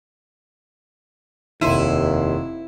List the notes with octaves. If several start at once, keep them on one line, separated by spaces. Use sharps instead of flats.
F1 D#2 E4 C6 D#7